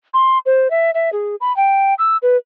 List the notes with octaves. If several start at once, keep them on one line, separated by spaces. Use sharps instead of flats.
C6
C5
E5
E5
G#4
B5
G5
E6
B4